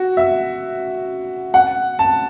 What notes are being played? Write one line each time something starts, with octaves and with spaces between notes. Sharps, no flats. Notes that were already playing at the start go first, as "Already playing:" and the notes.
Already playing: F#4
E5
F#5
A5